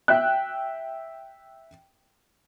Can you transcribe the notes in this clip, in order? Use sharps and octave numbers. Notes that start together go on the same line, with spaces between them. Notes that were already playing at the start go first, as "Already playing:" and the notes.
E5 G5 F#6